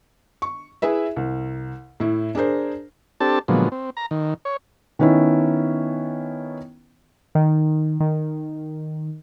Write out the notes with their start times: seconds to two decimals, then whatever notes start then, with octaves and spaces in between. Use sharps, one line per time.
0.42 C#6
0.82 E4 G#4 B4 E5
1.16 C2
2.00 A2 E4
2.35 D4 G#4 A#4 C5
3.20 C4 D4 G4 A4 A5
3.48 A#2 D3 F3 F#3 G#3 B3
3.72 C4
3.97 A#5
4.11 D#3
4.45 C#5
4.99 D#3 B3 C#4 D#4 E4
7.35 D#3
8.00 D#3